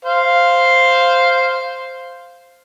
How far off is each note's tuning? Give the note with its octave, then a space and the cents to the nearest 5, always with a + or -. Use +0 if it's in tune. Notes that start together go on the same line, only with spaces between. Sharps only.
C5 +0 F5 +0